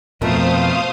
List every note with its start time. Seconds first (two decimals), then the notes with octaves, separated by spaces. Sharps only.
0.22 F2 B2 A3 C4 A#4 C5 F5 D#6